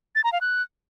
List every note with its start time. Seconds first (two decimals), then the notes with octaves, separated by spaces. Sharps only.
0.15 A6
0.24 A#5
0.33 F5
0.41 F#6